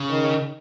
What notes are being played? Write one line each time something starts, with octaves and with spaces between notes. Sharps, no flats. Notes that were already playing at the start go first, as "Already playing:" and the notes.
Already playing: C#3
D#3